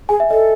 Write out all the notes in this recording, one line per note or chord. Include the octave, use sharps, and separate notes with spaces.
G#4 G#5
E5
A4 D#5